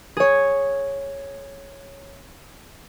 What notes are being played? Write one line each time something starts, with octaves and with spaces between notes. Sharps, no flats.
G#4 C#5